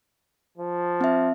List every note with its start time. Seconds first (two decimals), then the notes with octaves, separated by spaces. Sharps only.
0.58 F3
1.01 C4 E5